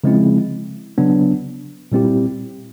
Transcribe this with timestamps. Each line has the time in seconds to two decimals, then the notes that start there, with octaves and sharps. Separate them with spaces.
0.04 C#3 F3 G#3 C4 E4
0.98 C#3 F#3 B3 D4
1.92 A#2 G3 C4 E4 G4